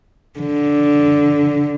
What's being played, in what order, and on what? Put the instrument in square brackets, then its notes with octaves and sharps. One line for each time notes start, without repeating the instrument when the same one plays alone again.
[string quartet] D3